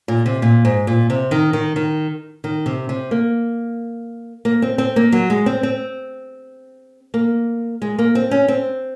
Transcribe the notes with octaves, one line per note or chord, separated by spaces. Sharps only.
A#2
C3
A#2
G#2
A#2
C3
D#3
D#3
D#3
D#3
C3
C3
A#3
A#3
C4
C4
A#3
F#3
G#3
C4
C4
A#3
G#3
A#3
C4
C#4
C4